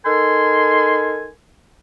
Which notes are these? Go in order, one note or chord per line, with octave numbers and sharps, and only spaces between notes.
D#4 A4 A#4 G#5 C6